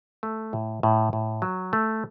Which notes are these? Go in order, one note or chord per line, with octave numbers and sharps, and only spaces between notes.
A3
A2
A2
A2
F#3
A3